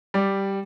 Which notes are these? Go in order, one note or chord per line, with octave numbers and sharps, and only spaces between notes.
G3 D5